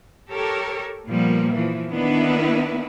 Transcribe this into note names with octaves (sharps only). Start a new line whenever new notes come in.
G4 A4 A#4 C#5
A#2 F3 G3 A#3 B3
E3 F3
D#3 A#3 B3 D4 E4 B4